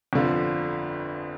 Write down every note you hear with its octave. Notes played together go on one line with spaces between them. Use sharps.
G1 F2 D3 F3